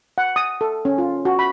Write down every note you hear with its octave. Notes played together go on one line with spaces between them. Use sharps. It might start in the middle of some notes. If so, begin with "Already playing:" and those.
F#5
D#6
A4
C#4
F4
F#4
B5